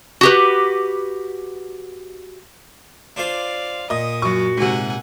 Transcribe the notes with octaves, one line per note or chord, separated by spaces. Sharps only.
F#4 G4 B4
D4 F4 C5 D5 F5
A#2 D#5 D#6
F#2 F#4 C#6
G#2 C3 F#5 G#5